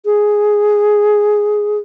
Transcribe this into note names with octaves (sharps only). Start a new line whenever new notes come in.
G#4